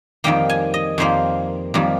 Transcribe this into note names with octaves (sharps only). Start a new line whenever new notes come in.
F2 D#3 G3 A#3 G5
G#5
D#5
F2 D#3 G3 A#3 C5
F2 D#3 G3 A#3